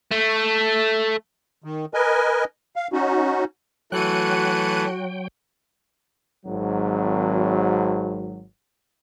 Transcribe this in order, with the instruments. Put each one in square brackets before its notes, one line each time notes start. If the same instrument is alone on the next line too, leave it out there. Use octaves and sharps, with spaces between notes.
[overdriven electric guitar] A3
[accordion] D#3
A#4 B4 D#5 G#5
F5
C#4 D#4 F#4
[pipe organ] E3 A3 [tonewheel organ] F#3 G5 [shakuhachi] F#4 [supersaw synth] F#6 C#7 D#7
[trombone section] G#1 F#3